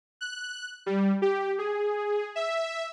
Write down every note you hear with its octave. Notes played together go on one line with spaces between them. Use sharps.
F#6
G3
G4
G#4
E5